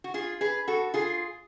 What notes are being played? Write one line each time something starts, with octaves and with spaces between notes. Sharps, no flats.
F#4
F4 G#4
G#4 B4
F#4 A4
F4 G#4